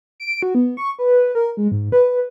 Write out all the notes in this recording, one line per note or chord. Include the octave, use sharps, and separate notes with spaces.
D7
F#4
B3
C#6
B4
A#4
G#3
G#2
B4